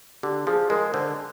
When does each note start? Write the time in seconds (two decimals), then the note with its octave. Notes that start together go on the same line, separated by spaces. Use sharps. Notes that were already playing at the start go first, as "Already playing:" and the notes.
0.23 D3 G4
0.47 F3 G#4
0.70 G#3 A#4
0.94 D3 C5